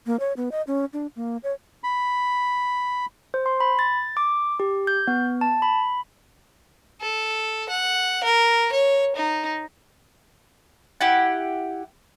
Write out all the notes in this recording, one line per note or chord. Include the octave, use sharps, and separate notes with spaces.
A#3
C#5
B3
D#5
C#4
D4
A#3
C#5
B5
C5
C6
B5
A6
D6
G4
G6
B3
A5
B5
A4
F#5
A#4
C#5
D#4
E4 G4 F#5